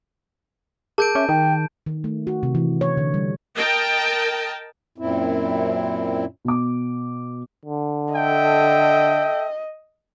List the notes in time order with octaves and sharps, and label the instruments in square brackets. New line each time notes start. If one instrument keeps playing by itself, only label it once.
[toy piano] G#4 A#4 D6 [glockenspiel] A5 G6 D7
[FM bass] C#4 [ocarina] E5 [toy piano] D6
[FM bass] D#3 [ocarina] G5
[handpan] D#3
A3
F#4
C3
E3
C#5
D3
G3
[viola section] A#4 D#5 G5 A5
[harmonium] F#2 A#2 C4 E4
[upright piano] B2 D6
[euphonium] D3
[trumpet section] A4 E5 G5 [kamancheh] D#5